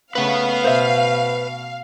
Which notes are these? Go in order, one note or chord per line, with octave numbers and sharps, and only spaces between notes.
C#3 A3 B4 F5 F#5
B2 C5 E5